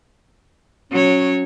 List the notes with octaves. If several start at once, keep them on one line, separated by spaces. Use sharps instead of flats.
F#3 C#4 C#5